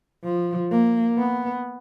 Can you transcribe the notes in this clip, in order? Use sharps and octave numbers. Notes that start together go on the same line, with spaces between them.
F3
A#3
B3